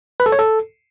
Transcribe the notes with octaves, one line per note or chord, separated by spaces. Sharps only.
B4
A4
C#5
A4